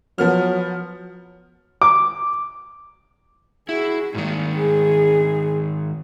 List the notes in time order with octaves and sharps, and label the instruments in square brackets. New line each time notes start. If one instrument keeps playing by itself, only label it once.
[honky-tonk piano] F3 B3 F6 [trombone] F#3
[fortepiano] D6
[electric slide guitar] E4 [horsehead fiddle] F#4 G#4
[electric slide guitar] G#2 D#3 [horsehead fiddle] G3 A#3
[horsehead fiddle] G#4